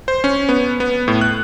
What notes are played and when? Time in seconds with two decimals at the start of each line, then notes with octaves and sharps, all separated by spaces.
0.08 C5
0.24 C#4
0.49 B3
0.80 B3
1.08 A2
1.21 F#6